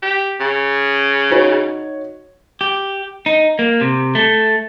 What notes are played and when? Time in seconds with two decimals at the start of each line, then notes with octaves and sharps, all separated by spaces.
0.03 G4
0.40 C#3
1.30 D#4 F#4 C#5
2.61 G4
3.26 D#4
3.59 A#3
3.81 C3
4.15 A3